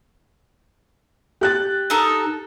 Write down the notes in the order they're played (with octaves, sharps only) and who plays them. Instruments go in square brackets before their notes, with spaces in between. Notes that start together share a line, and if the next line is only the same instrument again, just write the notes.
[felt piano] G4 F#6 A6
[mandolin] D#4 A4 A#4